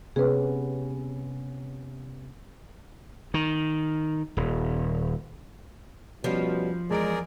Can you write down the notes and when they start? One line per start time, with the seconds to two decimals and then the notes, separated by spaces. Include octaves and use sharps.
0.16 C3 B3 C#4 G#4 B4
3.34 D#3
4.37 D#1
6.24 B2 F3 G3 C#4
6.90 E2 G#3 G#4 A#4 D5 A#5 D7